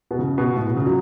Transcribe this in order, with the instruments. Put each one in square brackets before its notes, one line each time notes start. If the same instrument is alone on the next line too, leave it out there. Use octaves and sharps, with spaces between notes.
[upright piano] B2
C#3
B2
A2
B2
C#3
F#3